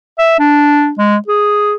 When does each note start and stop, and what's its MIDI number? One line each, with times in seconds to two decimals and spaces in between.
0.18 0.37 76
0.39 0.91 62
0.98 1.16 56
1.28 1.74 68